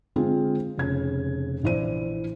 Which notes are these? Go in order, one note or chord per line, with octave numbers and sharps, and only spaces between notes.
D3 G#3 C4 F4 G#4
F1 C#3 G#6
A#1 E3 E4 C5 D5 D#7